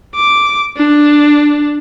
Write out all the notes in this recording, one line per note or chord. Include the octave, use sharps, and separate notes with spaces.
D6
D4